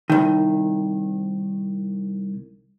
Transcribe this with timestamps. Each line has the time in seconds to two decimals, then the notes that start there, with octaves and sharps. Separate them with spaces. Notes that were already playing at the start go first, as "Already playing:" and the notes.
0.10 C2 D#3